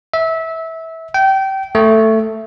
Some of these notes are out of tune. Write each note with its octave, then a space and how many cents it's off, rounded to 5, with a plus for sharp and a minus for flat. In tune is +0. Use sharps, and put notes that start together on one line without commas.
E5 -20
G5 -25
A3 +10